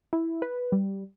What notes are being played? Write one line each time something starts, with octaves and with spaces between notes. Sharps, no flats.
E4
B4
G3